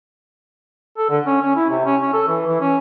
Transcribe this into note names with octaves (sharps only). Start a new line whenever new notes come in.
A4
D3
C#4
C#4
E4
C3
C#4
C#4
A4
E3
E3
C#4